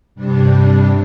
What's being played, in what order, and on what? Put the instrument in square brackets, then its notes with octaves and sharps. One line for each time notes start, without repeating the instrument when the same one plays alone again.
[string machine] G2 C3 G3 D4